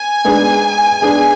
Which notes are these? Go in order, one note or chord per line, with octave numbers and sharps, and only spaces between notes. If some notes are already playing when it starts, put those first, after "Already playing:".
Already playing: G#5
G#2 G#3 B3 D4 G#4
G#2 G#3 B3 D4 G#4